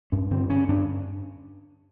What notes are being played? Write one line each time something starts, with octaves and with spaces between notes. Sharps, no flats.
G2 C#4
D3 C4
D3 C#4
G2 D4